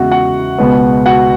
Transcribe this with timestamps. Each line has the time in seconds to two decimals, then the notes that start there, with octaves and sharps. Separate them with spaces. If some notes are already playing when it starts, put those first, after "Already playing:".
Already playing: E2 C#3 G#3 E4 F#4 F#5
0.11 F#4 F#5
0.58 C#2 B2 G#3 B3
1.06 F#4 F#5